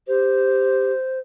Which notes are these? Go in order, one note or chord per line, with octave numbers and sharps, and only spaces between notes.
G4 C5